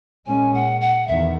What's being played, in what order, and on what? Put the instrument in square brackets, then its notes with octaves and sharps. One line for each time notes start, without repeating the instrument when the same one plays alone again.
[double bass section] A#2 G#3 C#4 [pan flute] G#5
[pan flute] F#5
F#5
[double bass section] E2 D#3 [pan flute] E5